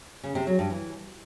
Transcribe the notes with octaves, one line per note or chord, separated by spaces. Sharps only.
C#3
C3
F#3
G2
E3